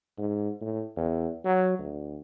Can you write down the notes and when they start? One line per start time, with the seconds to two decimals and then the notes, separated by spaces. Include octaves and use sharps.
0.18 G#2
0.61 A2
0.96 E2
1.44 F#3
1.79 D2